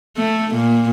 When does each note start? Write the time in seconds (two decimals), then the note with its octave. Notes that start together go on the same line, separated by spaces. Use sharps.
0.17 A3
0.55 A#2